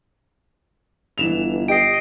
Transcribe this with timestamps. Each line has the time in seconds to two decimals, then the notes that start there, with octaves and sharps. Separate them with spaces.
1.18 G1 E3 E7 F7
1.68 G4 D#5 C7 D7